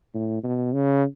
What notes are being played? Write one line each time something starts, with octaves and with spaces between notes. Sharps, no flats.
A2
B2
C#3